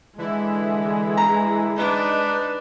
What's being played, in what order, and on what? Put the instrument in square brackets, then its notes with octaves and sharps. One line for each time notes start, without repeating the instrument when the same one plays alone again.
[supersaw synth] D3 E3 E4 [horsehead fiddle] G#3
[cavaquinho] A#5
[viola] D4 B4 [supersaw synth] D#4